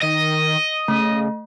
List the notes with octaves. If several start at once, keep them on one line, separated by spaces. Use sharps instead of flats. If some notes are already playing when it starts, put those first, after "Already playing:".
D#3 D#5
C#3 A3